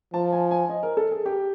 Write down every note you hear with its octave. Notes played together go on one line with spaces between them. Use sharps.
F3 A5
G#5
G#5
D#5
A#4
A4
G#4
G4